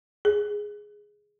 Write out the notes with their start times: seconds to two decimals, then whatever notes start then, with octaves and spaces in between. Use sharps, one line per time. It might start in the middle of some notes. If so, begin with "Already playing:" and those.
0.25 G#4